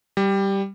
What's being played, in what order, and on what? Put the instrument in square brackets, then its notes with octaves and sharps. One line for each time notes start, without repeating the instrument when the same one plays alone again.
[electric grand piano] G3